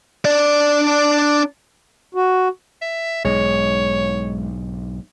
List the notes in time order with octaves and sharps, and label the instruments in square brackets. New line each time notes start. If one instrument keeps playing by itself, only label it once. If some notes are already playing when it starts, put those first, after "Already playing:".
[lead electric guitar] D4 D5
[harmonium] F#4
[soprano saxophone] E5
[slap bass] B1 G#2 [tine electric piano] G#3 [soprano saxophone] C#5